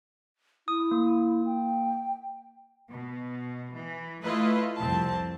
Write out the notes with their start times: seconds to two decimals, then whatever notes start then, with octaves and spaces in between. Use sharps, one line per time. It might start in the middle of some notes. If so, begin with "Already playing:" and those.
0.68 E4 D#6
0.91 A#3
1.46 G5
2.90 B2
3.76 E3
4.23 A3 E4 F4 B4 D#5
4.79 C2 F2 C4 A5